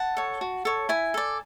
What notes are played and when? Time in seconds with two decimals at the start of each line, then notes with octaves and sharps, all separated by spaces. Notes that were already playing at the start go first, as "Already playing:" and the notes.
Already playing: F#5 A5
0.17 A4 C#5
0.41 F#4
0.65 A4 C#5
0.89 E4 G#5 B5
1.14 A4 D5